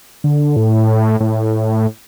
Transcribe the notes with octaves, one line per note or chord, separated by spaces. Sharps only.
D3
A2
A2